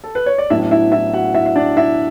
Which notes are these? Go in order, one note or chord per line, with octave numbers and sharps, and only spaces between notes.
A4
B4
C#5
D5
A1 A2 F#3 B3 D4 E4 E5
E4 E5
E4 E5
F#4 F#5
E4 E5
E5
D4 D5
E4 E5